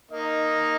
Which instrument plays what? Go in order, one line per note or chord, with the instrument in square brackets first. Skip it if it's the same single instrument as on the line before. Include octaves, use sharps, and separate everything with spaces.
[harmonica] A#3 D#4 [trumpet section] A#4 D#5